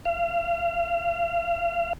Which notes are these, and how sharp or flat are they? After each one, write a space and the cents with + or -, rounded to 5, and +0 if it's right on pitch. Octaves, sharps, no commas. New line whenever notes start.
F5 -35